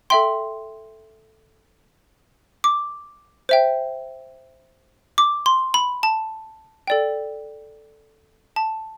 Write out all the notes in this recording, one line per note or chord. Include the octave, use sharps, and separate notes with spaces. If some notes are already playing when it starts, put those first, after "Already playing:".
A4 E5 G5 C6
D6
C5 E5 G5
D6
C6
B5
A5
A4 D5 G5
A5